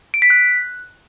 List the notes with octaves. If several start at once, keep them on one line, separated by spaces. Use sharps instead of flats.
D7
B6
F#6